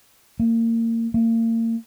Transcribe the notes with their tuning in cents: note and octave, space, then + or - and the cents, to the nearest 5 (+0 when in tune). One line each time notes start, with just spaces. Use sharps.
A#3 -30
A#3 -35